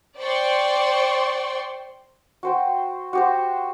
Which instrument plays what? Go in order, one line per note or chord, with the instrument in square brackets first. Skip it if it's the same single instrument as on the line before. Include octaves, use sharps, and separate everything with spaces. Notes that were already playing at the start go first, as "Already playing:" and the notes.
[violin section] C5 D5 G5 C6 C#6
[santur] F#4 C5 G5
F#4 G4 C5